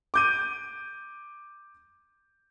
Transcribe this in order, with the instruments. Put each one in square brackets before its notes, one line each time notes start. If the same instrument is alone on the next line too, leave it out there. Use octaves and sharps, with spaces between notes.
[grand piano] D6 G6 D#7